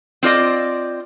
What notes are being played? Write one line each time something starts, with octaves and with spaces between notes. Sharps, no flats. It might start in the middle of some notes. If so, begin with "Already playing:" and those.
C4 F4 D5 D#5